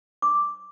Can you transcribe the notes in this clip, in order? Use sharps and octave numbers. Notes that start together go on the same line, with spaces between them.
D6